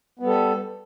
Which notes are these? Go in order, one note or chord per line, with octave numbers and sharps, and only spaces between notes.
G3 B3 A4